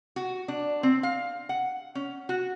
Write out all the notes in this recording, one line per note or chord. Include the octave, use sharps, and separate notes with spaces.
F#4
D4
C4
F5
F#5
C#4
F#4